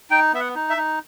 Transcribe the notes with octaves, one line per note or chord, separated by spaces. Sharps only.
D#4 G5
B3 E5
F#5
D#4
E5
D#4